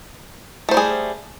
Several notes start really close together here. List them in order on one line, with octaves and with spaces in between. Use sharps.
A3 C5 G3 G#4